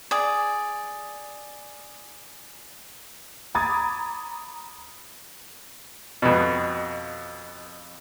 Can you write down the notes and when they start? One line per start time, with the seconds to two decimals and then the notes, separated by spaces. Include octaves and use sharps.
0.11 G#4 D5
3.55 A#5 B5 D6 D#6 G#6 A6
6.22 F2 B2